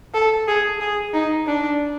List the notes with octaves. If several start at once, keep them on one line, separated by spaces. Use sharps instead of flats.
A4
G#4
G#4
D#4
D4